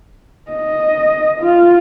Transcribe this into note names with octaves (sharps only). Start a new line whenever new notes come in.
D#5
F4